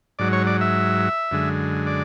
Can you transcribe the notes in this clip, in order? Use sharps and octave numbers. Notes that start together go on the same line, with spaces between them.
G#2 F#3 D5
C#5
D5
E5
F#2 D3 G#3
D5